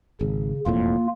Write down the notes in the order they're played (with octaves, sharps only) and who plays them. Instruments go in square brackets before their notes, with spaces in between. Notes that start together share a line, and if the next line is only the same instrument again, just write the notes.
[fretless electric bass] G#1 [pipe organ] C#3
[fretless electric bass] E1 F2 A2 [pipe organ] A#3 F4